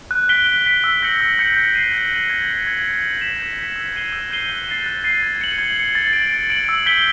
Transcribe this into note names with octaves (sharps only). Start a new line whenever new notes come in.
F#6
B6 D7 G7
F#6
B6 D7 G7
E6
G6 A#6 C#7 F#7
E6
G6 A#6 C#7 F#7
G6
C7 D#7 F#7
G6
C7 D#7 F#7
G#6
C#7 F#7
G#6
C#7 F#7
G6
B6 E7
G6
B6 E7
E6
G6 C7 D#7 G7
E6
G6 C7 D#7 G7
F#6
A6 C7 D#7
F#6
A6 C7 D#7
G#6
C#7 F#7
G#6
C#7 F#7
A6
D7 F#7
A6
D7 F#7
E6
G6 B6 D7 G7